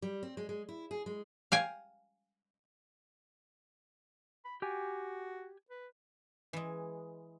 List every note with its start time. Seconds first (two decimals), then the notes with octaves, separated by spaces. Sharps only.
0.02 G3
0.23 C4
0.37 G#3
0.49 G#3
0.69 E4
0.91 G#4
1.06 G#3
1.52 F5 G5 G#5
4.45 B5
4.62 F#4 G4 G5 G#5
5.70 B4
6.53 E3 G#3